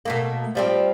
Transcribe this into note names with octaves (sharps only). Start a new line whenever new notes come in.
B2 A3 A#3
F3 G3 C4